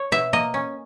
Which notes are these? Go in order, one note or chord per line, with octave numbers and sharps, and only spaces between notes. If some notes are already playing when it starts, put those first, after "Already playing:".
Already playing: C#5
B2 E5
A#3 D#5
C#4